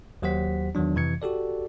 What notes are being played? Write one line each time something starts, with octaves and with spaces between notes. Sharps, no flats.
D#2 F#3 G4 C5 F#5 B6
E2 D#3 F#3 D4
F2 C3 E3 G#6 C#7
F#4 G4 A4 D5